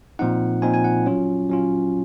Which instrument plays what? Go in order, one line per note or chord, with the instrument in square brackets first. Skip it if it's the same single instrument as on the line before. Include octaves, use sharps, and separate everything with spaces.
[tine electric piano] A#2 F3 C4 D#4 F#5
A#2 F3 C4 D#4 G#5
G#5
F#5
F#3 C#4 F4
F#3 C#4 F4